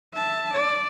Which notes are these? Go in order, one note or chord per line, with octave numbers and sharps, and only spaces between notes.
E5 A5
D5